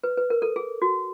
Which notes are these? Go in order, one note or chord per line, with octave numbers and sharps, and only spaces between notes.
B4
B4
A#4
A4
G#4
F#4